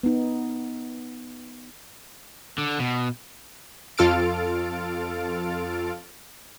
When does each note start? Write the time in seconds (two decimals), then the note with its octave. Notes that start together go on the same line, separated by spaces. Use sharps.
0.03 B3 D#4
2.58 D3
2.80 B2
3.98 F2 F4 A4 F6 A6 D7